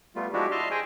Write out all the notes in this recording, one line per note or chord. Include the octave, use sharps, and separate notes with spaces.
G3 A3 B3 F4
F3 G#3 D4 E4 F#4 G4
D#5 E5 A5 C6 F6
G#4 C5 D#5 G5 G#5